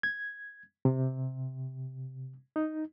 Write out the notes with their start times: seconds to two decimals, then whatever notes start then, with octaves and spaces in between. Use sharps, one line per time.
0.03 G#6
0.85 C3
2.56 D#4